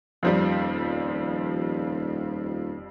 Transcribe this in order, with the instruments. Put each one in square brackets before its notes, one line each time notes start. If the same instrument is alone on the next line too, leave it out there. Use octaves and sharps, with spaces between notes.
[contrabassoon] D#1 [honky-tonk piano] F2 F3 G3